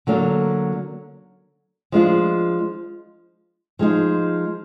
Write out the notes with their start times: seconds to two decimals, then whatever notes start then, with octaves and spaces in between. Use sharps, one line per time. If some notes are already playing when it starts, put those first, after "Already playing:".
0.07 D3 F#3 A#3 D4
1.92 F3 G#3 D4 F4
3.79 F3 G#3 D#4